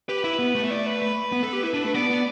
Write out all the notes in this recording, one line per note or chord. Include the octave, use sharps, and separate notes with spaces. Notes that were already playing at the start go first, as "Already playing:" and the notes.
G4 B4
E4
B3
A3
E5
D5
B4
B4
B3
A4
G4
E4
D4
A3
B3 D5
B3